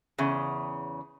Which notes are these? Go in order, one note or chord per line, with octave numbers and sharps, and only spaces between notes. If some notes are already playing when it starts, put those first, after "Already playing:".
E2 C#3